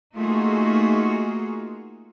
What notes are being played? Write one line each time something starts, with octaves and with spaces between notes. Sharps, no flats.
A3 A#3 D#4 F4 F#4 G#4